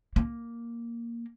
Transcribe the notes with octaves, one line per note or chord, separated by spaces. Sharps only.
A#3